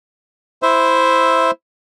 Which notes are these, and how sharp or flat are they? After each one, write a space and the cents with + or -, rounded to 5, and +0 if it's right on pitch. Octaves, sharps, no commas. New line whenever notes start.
E4 +0 C5 +0 E5 +0